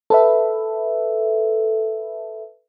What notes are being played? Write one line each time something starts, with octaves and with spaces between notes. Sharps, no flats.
A4 B4 E5